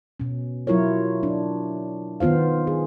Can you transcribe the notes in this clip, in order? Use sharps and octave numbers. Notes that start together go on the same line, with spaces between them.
B2 C#4
F#3 E4 F4 A#4 C#5
D4
D#3 B3 F4 C5 F5
G#4